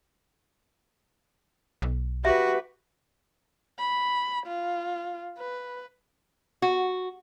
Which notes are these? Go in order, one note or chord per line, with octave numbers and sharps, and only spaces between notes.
B1
F#4 G4 B4 E5
B5
F4
B4
F#4